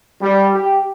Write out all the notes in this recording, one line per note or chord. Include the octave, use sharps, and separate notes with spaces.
G3
G4